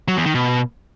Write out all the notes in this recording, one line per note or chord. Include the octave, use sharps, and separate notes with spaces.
F#3
E2
D#3
B2